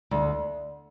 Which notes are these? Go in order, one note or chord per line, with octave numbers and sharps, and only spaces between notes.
D2